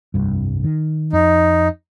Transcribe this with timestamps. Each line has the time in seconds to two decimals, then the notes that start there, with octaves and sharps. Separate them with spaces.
0.14 F1 C2 G2
0.64 D#3
1.13 F2 D#4